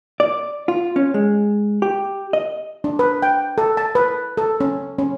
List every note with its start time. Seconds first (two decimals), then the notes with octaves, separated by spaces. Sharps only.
0.20 D5
0.68 F4
0.96 C#4
1.14 G#3
1.82 G4
2.33 D#5
2.84 D4
2.99 B4
3.22 G5
3.58 A4
3.77 A5
3.95 B4
4.37 A4
4.60 C#4
4.99 C#4